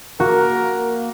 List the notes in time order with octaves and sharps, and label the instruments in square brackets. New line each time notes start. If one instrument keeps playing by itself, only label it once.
[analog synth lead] A#3 [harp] F#4 [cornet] A#4